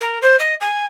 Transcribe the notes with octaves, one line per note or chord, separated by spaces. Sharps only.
A#4
C5
D#5
G#5